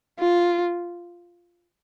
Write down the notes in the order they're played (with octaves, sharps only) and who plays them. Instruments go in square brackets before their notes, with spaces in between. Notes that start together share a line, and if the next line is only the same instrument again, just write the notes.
[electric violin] F4